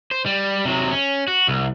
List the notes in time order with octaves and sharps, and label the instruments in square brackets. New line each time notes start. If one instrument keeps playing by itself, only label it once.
[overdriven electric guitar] C5
G3
C3 F#3
C#4
F#4
C2